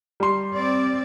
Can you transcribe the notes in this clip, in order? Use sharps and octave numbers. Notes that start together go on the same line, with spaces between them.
G3 C6
C4 D5